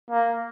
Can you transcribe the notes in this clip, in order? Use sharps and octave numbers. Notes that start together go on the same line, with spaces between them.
A#3